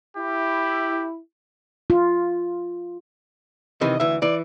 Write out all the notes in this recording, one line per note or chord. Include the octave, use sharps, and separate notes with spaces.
E4 G4
F4
C3 D#3 E3 D#5
D2 E3 E5
E3 D5